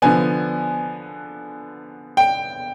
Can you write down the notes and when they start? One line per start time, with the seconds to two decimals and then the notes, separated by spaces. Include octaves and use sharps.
0.02 D3 F3 B3 G#5
2.17 G5